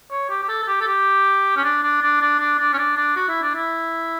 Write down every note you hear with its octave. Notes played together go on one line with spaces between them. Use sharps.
C#5
G4
G4
A4
A4
G4
A4
G4
C#4
D4
D4
D4
D4
D4
D4
C#4
D4
D4
F#4
E4
D4
E4